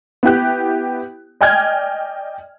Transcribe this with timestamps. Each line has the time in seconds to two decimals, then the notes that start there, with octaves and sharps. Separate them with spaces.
0.23 B3 E4 G4 F#6
1.41 D5 D#5 G5 G#5 F6 G#6